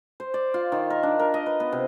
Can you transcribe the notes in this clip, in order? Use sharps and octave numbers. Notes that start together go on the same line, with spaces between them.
C5
D5
F4
D#3
A#4
D4
A#4
D#5
B4
B3
C3